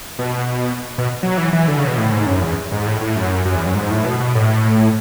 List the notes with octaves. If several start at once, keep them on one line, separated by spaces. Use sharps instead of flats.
B2
B2
F#3
E3
E3
D3
C#3
B2
A2
G#2
F#2
E2
G#2
A2
A2
F#2
F#2
E2
F#2
G#2
A2
B2
B2
A2